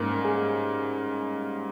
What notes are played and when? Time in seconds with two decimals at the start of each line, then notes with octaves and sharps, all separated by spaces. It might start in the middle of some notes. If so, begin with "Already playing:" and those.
Already playing: G#2 G3 A#3 C#4 A#4
0.25 G#4